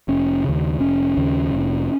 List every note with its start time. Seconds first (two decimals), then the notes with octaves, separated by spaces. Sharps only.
0.08 F1 C#4
0.44 D#2 C#3
0.80 F1 C#4
1.17 D#2 C#3
1.52 F1